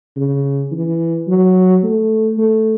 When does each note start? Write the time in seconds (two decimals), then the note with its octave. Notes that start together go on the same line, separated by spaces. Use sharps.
0.17 C#3
0.72 E3
1.28 F#3
1.83 A3
2.38 A3